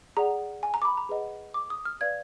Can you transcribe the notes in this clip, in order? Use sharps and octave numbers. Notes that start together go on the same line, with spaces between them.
G#4 D5 F#5 A#5
G#5
A#5
D6
B5
A#5
G#4 B4 D#5 F#5
D6
D#6
F6
B4 D5 F5 G#6